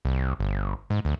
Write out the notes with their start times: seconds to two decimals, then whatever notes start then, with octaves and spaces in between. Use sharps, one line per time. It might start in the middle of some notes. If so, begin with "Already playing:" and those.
0.05 C2
0.39 G1
0.90 G#2
1.05 D2